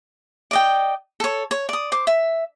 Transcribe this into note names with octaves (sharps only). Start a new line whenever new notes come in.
D5 D#5 G5
A4 C#5
C#5
D5 D#6
C5 D6
E5